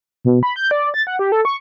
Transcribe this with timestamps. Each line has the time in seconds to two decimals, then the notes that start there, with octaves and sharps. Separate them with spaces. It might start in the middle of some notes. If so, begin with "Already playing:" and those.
0.25 B2
0.43 B5
0.56 G6
0.71 D5
0.94 A6
1.07 F#5
1.19 G4
1.32 A4
1.45 C#6